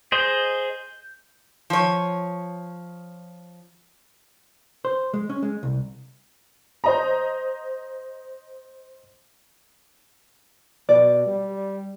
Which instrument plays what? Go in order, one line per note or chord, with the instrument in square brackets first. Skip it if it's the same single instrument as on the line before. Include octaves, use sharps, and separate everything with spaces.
[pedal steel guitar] G#4 C5 D#5 [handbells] G6
[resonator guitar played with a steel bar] F3 C#5
[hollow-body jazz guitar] C5
G#3
C#4
G#3
C2
[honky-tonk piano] C5 D#5 A#5
[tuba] B2 [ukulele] D5
[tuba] G3